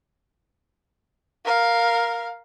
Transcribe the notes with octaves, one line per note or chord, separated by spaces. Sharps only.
A#4 F5